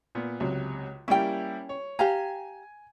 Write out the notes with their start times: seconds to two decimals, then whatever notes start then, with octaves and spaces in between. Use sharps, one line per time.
0.15 A#2 B3
0.40 C#2 C3 F#3
1.08 G3 A#3 C#4 E4 G5
1.69 C#5
1.99 G4 F5 G#5 A#5